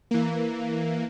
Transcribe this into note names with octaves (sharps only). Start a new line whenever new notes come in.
E3 A#3